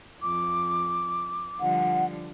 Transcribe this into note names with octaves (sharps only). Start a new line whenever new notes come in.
F2 D6
D3 F3 G3 F#5